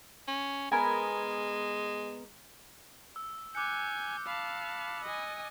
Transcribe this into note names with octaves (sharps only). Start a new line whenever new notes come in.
C#4
G#3 B3 A#4 G#5
E6
G#5 D6 F#6 G6 C#7
F5 A5 B5
D#5 G#5